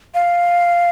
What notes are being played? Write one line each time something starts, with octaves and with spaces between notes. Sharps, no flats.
F5